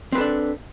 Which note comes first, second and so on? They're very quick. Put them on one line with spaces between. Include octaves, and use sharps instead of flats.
C4 B4 A4 D4